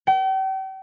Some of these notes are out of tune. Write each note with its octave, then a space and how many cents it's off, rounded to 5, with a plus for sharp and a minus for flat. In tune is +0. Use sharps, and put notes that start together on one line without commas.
G5 -40